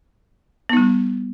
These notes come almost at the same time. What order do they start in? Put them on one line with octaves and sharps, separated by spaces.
B3 D#4 G3